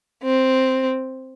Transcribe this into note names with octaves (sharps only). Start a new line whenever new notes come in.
C4